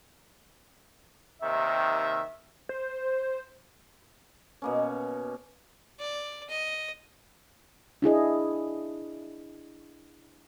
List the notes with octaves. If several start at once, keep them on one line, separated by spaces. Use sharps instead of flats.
D#2 C3 D#3 E5
C5
B2 A#3 C#4
D5
D#5
D4 E4 G#4 D#5